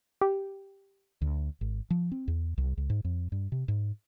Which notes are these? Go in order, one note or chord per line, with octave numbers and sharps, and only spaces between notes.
G4
D2
G#1
F3
C4
E2
C2
C#2
G#2
F2
G2
C3
G#2